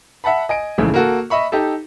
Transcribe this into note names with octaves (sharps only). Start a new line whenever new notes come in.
E5 F#5 A5 B5
D#5 G#5 D7
A#1 G#2 C#3 E3 A3
A#3 F#4 A4
D#5 E5 B5 C#6
D#4 G4 A4